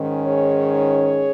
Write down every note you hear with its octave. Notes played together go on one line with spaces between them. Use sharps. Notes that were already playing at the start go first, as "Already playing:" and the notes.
Already playing: G#2 D#3 C#4
G#4 C#5